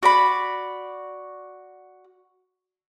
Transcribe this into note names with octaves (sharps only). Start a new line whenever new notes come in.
F#4 D5 B5